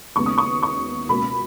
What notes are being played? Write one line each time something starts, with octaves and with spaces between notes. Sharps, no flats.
D#2 C#3 G#3 B3 C#6
D#6
C#6
C#6
C#2 B2 A#3 B5